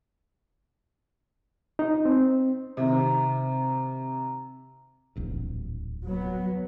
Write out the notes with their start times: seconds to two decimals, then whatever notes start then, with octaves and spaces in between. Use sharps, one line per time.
1.79 D#4
2.05 C4
2.77 C3 D#3 C4 A#5
5.16 D1 A#1 E2
6.04 F#3 B3